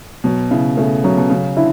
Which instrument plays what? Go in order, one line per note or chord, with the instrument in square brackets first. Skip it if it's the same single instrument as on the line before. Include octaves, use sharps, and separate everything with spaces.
[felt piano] B2 [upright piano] F#3
[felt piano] C#3 [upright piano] E4
[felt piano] C#3 [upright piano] A3
[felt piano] C#3 [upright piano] F#3
[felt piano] B2
[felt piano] C#3 [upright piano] F#3
[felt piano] D3 [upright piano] E4